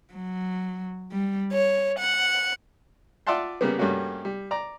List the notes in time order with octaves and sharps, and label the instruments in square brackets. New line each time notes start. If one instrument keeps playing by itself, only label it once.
[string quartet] F#3
G3
C#5
F#5
[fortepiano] F4 D5 E5 F#5 A5 C6
C#3 G3 A#3 B3
G2 G3 A3 A#3 C#4 F#4
G3
D5 A#5